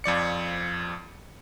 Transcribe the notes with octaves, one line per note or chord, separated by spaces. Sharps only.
F2 F3 D5 C#7